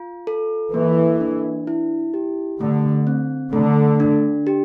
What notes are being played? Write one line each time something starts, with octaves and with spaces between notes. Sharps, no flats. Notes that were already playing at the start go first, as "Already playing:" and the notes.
Already playing: F4
A4
E3 A#3
D4
E4
G4
D3 A3
C4
D3 A3
D4
G4